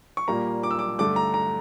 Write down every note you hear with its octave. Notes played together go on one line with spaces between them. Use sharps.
C#6
A#2 G3 A#3 A#5
D6
E6
D6
G2 D3 A3 D6
A#5
A#5